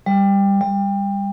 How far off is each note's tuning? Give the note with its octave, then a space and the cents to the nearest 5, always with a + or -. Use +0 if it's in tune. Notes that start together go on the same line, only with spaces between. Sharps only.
G3 +15
G3 +25